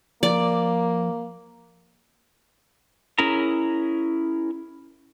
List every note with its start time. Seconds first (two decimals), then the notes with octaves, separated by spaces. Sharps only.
0.23 F3 A#3 D5
3.18 C#4 E4 G#4 A#4 A#5